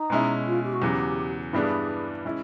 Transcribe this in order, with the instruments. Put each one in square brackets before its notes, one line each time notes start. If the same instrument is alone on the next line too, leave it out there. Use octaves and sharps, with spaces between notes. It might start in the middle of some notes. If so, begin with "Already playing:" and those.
Already playing: [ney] D#4
[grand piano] B2 G#3 C#4 E4
[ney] F4
G4
F#4
[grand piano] E2 C#3 F#3 [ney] G4
[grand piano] G2 E3 G3 B3 D4 [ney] G#4
[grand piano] E3 G#3 C#4 E4